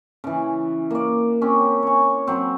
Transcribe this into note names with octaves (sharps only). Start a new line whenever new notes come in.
C#3 E3
A#3 D5
C4 C#4 G4
C#5 G#5
F#3 C4